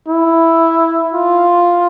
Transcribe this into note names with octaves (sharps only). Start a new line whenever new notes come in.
E4
F4